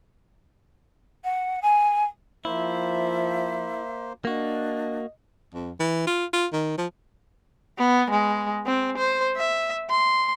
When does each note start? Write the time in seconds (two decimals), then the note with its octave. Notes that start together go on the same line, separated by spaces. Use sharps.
1.24 F#5
1.62 G#5
2.45 F3 A#3 E4 C5 E5
4.25 A#3 D4 F#4 D#5
5.54 F2
5.79 E3
6.07 F4
6.33 F4
6.53 D#3
6.78 F3
7.78 B3
8.11 G#3
8.66 C4
8.98 C5
9.37 E5
9.90 C6